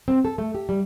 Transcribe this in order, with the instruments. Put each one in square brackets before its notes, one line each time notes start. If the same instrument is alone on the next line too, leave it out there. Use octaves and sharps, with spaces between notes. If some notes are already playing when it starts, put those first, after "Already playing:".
[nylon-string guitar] C4
A4
A3
G4
G3